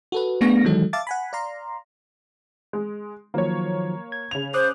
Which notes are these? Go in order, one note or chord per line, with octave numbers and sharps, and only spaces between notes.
F#4 A4 B4
A3 B3 D4 G#4 C#6 A#6
D#3 E3 F#3 G#3 D#4 A4
E5 F5 A5 D6 A6
F#5 G#5 B5
D5 F5 A#5 C6
G#3
D#3 F3 F#3 A#3 C#5
G#6
C#3 F7
C5 D6 D#6 F#6